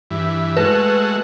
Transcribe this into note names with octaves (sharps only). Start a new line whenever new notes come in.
G2 E3
G#3 A3 F#4 B4